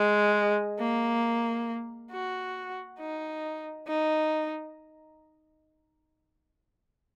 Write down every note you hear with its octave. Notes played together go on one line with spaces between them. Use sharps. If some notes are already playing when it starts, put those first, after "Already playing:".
Already playing: G#3
A#3
F#4
D#4
D#4